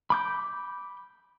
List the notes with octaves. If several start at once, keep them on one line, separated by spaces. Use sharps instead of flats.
B5 D6 G6